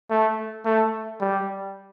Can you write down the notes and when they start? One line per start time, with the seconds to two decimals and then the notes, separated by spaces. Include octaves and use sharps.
0.10 A3
0.65 A3
1.21 G3